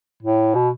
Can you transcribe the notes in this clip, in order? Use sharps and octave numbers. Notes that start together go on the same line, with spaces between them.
A2
B2